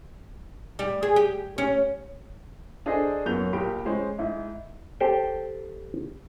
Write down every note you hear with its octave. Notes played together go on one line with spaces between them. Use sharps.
G3
G#4
G4
C#4
D4 G#4 A4 C5 D5 D#5
F#2 F#3 A#3 B3 G6 F7
A#1 A#2 G4 B5 D7
G#3 C#4 C5 C#5
G#2 E4
G4 A4 C5 G5